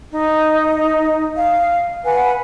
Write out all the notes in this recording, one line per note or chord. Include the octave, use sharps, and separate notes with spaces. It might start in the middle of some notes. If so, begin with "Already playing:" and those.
D#4
F5
B4 F#5 G#5